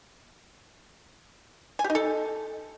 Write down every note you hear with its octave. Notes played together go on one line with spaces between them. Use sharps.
G#5
G4
D#4
A4